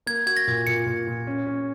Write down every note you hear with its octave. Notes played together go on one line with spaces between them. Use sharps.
A#3 G#6
F#4 G#6
A#6
A#2
A#2 C#7
A#2
A#2
C#4
C#4